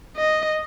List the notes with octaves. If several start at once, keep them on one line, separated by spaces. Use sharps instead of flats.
D#5